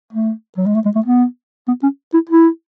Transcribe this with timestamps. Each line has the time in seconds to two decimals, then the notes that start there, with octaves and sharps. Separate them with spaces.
0.13 A3
0.58 F#3
0.66 G#3
0.75 A3
0.85 G#3
0.96 A3
1.06 B3
1.68 B3
1.83 C#4
2.14 E4
2.29 E4